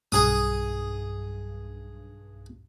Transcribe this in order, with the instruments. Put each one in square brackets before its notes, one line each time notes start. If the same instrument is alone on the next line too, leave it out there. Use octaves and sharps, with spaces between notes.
[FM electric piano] B1 G2 [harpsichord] G#4 D#6